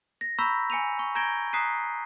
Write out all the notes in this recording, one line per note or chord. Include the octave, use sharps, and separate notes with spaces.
A#6
A#5 B5 C#6 E6 G6 B6
G#5 C#7 D#7 F7
C#6
A#5 G6 G#6 A#6 D7 G7
A#5 D#6 F#6 B6 C7 D#7